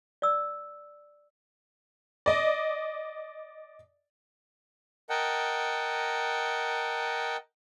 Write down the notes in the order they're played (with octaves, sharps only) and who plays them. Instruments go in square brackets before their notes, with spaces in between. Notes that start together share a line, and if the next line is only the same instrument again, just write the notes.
[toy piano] D5 E6
[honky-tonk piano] D5 D#5
[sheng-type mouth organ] A#4 D#5 F#5 G5 A5